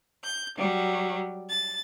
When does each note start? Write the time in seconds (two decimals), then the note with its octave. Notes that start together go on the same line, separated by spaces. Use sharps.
0.24 G6
0.57 F#3 G3
1.50 A6